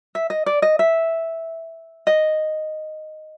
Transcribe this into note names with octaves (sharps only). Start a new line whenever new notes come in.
E5
D#5
D5
D#5
E5
D#5